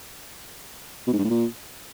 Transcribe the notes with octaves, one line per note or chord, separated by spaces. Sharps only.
B2
G#2
G2
A2
A#2